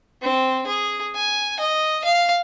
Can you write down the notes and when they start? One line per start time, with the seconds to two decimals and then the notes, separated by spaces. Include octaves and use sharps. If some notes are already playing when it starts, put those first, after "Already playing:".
0.22 C4
0.67 G#4
1.15 G#5
1.60 D#5
2.04 F5